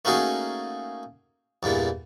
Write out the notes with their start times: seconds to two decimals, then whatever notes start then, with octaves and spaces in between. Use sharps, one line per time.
0.05 A3 A#3 C#4 D#4 F#4 G#4
1.63 E2 G2 A#2 E3